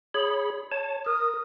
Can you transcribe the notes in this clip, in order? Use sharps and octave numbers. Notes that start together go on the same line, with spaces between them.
G#4 C#5 B5
C#5 A5
A#4 D#6